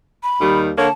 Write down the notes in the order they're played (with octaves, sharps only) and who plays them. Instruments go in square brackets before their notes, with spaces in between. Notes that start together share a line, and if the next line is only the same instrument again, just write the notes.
[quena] B5
[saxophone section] D#2 D#3 G3
[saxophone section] D3 A#3 C#5 [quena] A5